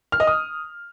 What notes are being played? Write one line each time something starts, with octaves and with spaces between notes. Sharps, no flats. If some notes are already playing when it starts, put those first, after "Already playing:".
F6
D#5
D#6